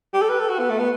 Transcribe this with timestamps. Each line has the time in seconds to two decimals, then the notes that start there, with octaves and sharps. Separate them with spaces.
0.14 G4
0.22 A4
0.29 B4
0.40 A4
0.49 F#4
0.59 B3
0.70 A3
0.79 B3